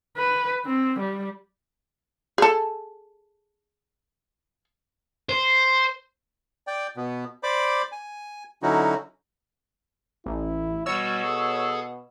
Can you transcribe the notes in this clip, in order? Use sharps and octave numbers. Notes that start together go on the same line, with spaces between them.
B4
C4
G3
G#4 A4
C5
D5 G5
B2 B3
C5 D5 B5 D6
G#5
D3 F#3 C#4 D#4 E4 F#4
A1 E4
B2 G3 F#4 C#5 E6
G#4 A4